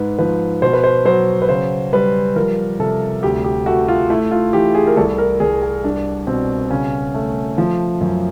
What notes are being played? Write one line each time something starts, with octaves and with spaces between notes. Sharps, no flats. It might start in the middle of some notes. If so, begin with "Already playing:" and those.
Already playing: G#2 B4
F3 B4
B2 C5
B4
C5
F#3 C5
B4
C#3 C5
G3 B4
F3 A#4
C3 A4
D2 G4
G4
A3 F#4
F4
A3 E4
F4
E3 G4
G#4
A#4
C2 A4
A#4
C2 G#4
G#4
G3 D4
B2 C4
C#3 C#4
A3
F3
F#2